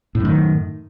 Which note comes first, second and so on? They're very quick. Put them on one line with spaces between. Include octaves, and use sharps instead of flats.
A2 F#2 D#3